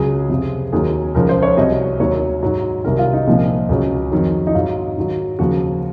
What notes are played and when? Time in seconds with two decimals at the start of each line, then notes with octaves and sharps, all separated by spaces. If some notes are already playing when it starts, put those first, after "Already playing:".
Already playing: C#2 C#3 F#3 G#4
0.30 F2 C3 F3
0.73 D#2 D#3 F#3 G#4
1.14 C#2 C#3 F3 A#4
1.29 C5
1.42 C#5
1.57 C2 C3 F#3 D#5
1.99 D#2 D#3 F#3 C#5
2.43 G#2 F#3
2.84 C2 C3 D#3 F#3 A#4
2.99 F4
3.13 D#4
3.27 C2 A#2 F3 D#4
3.69 C#2 C#3 F#3
4.12 F2 D#3 F#3
4.47 D#4
4.54 G#2 F#3 F4
4.97 G#2 D#3 F#3
5.39 D#2 C#3 F3 F#4